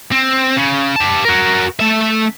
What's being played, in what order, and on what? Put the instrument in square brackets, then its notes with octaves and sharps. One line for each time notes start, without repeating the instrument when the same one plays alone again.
[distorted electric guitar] C4
C#3
G4 A5
F#4 A#4
A3 E5